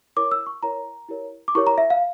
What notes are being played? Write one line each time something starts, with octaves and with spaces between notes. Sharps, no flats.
E4 A#4 C#5 D6
E6
C#6
E4 A#4 C#5 A#5
E4 G4 A#4 C#5
D6
E4 G4 A#4 C#5 C#6
A#5
E5
F5